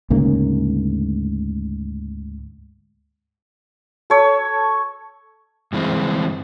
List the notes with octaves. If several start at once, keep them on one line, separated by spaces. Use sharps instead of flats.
D2 G#2 C#3 A#3
A4 C#5
G2 E3 G#3 C4